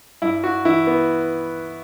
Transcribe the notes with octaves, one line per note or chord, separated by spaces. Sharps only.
G2 E4
F#4
E3 E4
B3